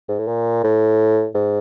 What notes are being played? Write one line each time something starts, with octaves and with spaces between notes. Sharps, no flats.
G#2
A2
A#2
A2
G#2